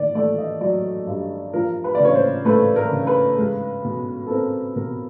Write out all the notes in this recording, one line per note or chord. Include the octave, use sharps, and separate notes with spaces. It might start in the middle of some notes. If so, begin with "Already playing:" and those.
Already playing: D#3 D5
A3 D5
D#5
F#3 D5
G2
F3 A#4
B4
C#3 D5
C#5
C5
A3 B4
A#4
C#3
B4
G#3
B2
A4
C4 A#4
B2 A#4